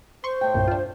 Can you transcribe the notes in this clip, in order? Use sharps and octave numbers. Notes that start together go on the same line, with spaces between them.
C5 C6 C#6
A2 A3 G5
C2 G2 A#2
D4 F4